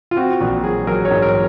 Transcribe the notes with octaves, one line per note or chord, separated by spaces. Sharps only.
F4
C4 F#4
A#1 F#4
F#3 G#4
F#3 A#4
C#5
G#2
A#4